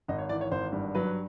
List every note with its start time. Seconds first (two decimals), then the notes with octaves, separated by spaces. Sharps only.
0.08 G#1 D#5
0.19 C#5
0.29 E3 D5
0.41 C#5
0.51 G#1 C5
0.73 G2
0.95 F#3 B4